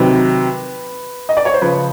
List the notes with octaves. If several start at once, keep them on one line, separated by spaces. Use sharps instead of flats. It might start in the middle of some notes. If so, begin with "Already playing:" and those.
Already playing: C3 D#3 F#3 B4
D#5
D5
C#5
C5
C#3 F3 B4